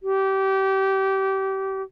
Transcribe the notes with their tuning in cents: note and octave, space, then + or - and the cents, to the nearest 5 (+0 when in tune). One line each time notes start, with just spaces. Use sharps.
G4 -25